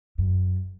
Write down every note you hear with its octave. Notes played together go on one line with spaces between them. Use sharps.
F#2